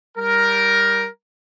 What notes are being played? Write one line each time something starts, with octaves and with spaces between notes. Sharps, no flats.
G3 A#4